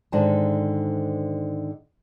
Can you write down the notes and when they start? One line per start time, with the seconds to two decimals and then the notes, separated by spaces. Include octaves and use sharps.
0.12 G#2 D3 D#3 A5